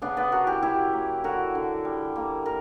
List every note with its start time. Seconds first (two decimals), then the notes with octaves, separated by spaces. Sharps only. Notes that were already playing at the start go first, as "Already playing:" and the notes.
0.02 C#3 B3 D4
0.17 B3 D4
0.32 C#3 F#4 A#4
0.47 E4 G4
0.62 F#3 E4 G4
0.93 A#3
1.24 D3 F#4 A#4
1.55 D3
1.85 G3
2.16 A#3
2.46 A#4